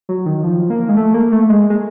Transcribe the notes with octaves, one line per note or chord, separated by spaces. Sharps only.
F#3
D#3
F3
A#3
G#3
A3
A#3
A3
G#3
G#3